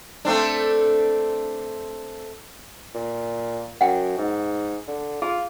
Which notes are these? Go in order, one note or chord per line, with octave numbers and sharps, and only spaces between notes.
A3 C4 D4
A#2
F#2 F#5 G5
G#2
D3
F4 G#4